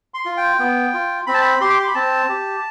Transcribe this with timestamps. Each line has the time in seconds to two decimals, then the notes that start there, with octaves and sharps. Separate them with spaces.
0.14 C6
0.25 F4
0.37 G5
0.59 B3
0.94 F4
1.27 C4 B5
1.34 A5
1.41 B5
1.61 G4 C6
1.70 D6
1.79 C6
1.87 B5
1.95 C4 A5
2.29 G4